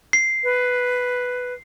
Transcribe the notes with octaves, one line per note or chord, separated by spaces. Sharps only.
C7
B4